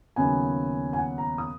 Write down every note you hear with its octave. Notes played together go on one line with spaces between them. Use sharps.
D#2 C#3 F#3 B3 G#5
G#5
F#5
A#5
D#6